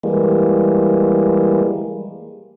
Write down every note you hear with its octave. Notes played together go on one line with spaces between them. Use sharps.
E3 G3 G#3 A#3